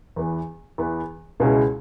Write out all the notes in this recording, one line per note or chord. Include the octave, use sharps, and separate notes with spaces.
E2 E3 B3
E2 E3 B3
C#2 B2 G#3 C#4 E4